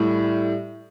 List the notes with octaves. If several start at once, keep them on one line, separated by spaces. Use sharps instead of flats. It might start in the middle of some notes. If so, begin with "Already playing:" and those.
Already playing: A2 G3